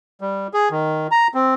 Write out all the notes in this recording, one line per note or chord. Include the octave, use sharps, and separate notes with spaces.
G3
G#4
D#3
A#5
C4